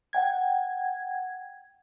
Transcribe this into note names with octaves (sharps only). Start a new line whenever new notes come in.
F#5 G5 G#6